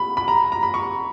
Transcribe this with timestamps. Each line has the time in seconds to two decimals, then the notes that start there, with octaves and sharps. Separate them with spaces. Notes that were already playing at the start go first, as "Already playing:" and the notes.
Already playing: B5
0.17 B5
0.28 A#5
0.52 A#5
0.63 B5
0.74 C#6